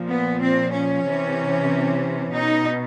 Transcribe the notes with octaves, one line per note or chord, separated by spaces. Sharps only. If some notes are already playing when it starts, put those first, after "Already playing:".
Already playing: A#2 F3
B3
C4
C#4
C3 E3
B2 D#4